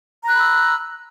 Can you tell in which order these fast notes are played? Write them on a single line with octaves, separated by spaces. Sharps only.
A#5 F#6 B5 E6